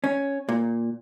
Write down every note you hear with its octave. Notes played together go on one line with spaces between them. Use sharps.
C#4
A#2